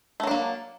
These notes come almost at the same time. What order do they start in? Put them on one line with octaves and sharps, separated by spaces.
A3 F#3 D4 A#3